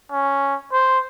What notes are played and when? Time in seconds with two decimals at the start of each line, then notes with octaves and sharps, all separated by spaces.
0.12 C#4
0.72 C5